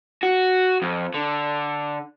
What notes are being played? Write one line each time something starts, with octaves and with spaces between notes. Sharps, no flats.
F#4
F2
D3